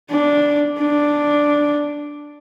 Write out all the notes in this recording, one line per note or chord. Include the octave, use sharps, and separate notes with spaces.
D4
D4